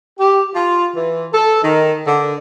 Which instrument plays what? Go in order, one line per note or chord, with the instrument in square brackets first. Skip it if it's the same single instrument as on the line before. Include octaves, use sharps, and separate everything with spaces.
[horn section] G4
F4
E3
A4
D#3
D3